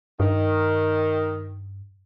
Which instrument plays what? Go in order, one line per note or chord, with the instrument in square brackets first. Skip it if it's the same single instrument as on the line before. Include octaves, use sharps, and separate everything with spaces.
[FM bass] G2 [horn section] D#3